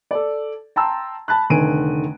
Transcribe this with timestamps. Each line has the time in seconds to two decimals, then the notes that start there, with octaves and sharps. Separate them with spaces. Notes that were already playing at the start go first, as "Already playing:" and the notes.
0.11 A4 D5
0.76 G5 A5 A#5 C6 E6
1.28 A5 B5 F#6
1.50 F1 D3 D#3 G#5 D7 D#7